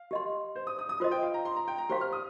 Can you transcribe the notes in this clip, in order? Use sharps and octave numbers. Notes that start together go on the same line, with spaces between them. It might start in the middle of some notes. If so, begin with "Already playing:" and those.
Already playing: F5
G4 D#5 C6
C5
D#6
D#6
D#6
F4 C5 D#5 C6
G5
F5
A#5
C6
A#5
G5
A#5
G4 C5 F5 C6
F6
D#6